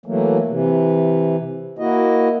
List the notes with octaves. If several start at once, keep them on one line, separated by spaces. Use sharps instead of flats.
E3 F#3 A3 A#3
C3 E3
A#3 E4 F#4 D#5